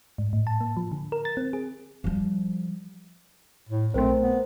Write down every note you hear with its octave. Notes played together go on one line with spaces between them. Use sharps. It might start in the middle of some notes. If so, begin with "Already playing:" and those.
G#2
A2
A5
A#3
F3
D3
A#4
A6
C4
G#4
F3 G3
A2
B1 A3 C4 A#4 C5
B3